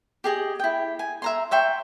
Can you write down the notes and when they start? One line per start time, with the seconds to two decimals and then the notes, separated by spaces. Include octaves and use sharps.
0.24 G4 G#4 D#5
0.60 E4 G5
0.99 G#5
1.22 E5 A#5 C6
1.51 C#5 E5 G5 C6